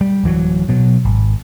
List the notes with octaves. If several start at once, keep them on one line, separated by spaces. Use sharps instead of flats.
G3
D1 E3 F#3
B2 F#3
G#1